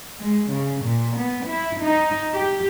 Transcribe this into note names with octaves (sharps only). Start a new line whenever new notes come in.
G#3
C#3
A#2
B3
E4
D#4
G4